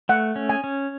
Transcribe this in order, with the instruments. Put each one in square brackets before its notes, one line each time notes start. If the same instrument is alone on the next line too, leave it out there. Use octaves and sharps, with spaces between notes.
[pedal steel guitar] A3 [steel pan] F#5
[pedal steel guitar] C#4
[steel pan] G#5
[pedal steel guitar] C#4